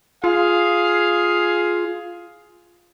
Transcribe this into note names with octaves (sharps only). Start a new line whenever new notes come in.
F4 G#4 F5